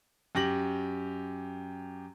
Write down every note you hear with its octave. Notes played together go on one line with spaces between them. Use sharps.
F#2 G4 A#6 F#7